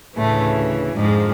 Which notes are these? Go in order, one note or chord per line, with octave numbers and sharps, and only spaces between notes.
D2 A2 C#3 E3 A3
F2 G#2 D3 F3 G#3